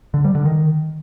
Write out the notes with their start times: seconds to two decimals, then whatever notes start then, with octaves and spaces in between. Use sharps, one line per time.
0.14 D3
0.24 G3
0.35 D3
0.45 D#3